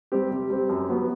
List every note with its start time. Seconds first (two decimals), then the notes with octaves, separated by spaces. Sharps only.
0.12 G3 C4 G4
0.31 C3
0.50 G3 C4 G4
0.69 F#2
0.89 F#3 B3